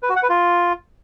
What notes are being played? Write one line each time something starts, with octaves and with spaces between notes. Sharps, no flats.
B4
F#4
F#5
B4
F4